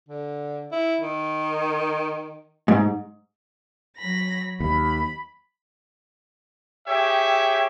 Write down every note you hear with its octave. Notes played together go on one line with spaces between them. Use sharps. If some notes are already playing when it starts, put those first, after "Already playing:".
D3
E4
D#3
G#2
F#3 B5 A#6
D#2 B5
G4 G#4 C#5 E5 G5